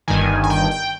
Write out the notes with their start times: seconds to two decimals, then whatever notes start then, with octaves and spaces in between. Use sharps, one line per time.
0.08 G1 G2 D#3 G#5
0.44 G#5
0.50 G5
0.71 G5